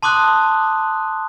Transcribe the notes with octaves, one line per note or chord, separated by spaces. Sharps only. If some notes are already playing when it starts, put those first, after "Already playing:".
A5 C6 D6 D#6 F#6